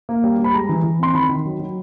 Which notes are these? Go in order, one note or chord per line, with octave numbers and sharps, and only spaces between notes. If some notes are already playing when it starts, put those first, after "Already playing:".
A#3
G3
G3
B5
G#3 A#5
E3
E3
C4 C6
D#3 B5
D#3
F#3
F#3